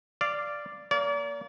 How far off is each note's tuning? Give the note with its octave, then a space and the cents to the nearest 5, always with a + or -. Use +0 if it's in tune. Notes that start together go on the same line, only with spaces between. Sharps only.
D5 +0 F5 -15
A#3 +0 D5 -40